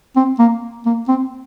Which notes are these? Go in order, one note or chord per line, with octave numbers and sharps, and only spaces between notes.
C4
A#3
A#3
C4